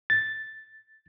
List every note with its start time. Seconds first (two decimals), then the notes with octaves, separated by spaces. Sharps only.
0.10 A6